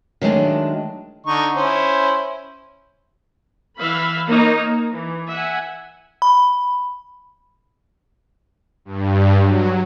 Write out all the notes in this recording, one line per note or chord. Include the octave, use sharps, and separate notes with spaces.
D#3 F#3 G#3 A3 D4
D3 D#4 C#6
C#4 E4 C5
E3 E5 F5 B5
A#3 D#4 C#5 A#5
A#3
E3
E5 F#5 G#5
B5
G2
F#3